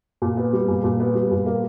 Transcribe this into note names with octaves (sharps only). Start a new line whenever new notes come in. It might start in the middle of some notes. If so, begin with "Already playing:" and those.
A#2
B3
G3
A#2
A#2
B3
G3
A#2
A#3